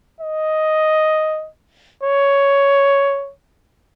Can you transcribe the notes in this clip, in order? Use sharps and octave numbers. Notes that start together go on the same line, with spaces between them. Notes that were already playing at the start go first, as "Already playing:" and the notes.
D#5
C#5